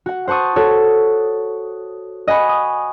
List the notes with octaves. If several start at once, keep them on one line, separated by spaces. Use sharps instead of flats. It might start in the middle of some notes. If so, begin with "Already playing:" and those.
F#4 F#5
C5 F#5 A5 C#6 D#6
F#4 A4 C#5
D#5 F#5 G#5 B5 C#6
D#6